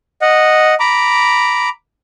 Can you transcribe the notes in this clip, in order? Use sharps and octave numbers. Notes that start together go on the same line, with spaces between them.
D#5 F#5
A#5 B5 D6